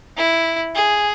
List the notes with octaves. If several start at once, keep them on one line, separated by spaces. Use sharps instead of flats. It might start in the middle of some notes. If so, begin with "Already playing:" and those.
E4
G#4